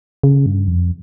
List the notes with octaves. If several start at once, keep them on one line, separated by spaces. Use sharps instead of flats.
C#3
G2
F2